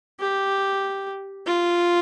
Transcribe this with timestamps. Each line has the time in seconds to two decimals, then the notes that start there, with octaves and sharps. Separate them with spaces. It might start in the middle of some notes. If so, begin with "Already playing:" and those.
0.20 G4
1.47 F4